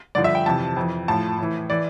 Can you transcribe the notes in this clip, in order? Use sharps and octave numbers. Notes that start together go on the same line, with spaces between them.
G2 D3 F3 D5
E5
G5
F2 C3 E3 A5
F2 E3
A2 F3 A5
A2 E3
E3 D5